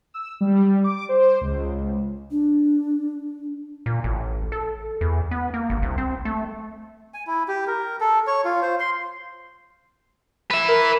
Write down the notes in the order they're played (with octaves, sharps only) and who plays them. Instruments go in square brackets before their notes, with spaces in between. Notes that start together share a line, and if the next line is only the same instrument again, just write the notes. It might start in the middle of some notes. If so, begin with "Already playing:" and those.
[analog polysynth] E6
G3
D6
C5
C#2
[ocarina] D4
[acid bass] A#2
A1
A4
E2
B3
A#3
G1
C2
C4
A3
[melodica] G#5
E4
G4
A#4
A4
C#5
F4
C5
C6
[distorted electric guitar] B4 E5
[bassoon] A#4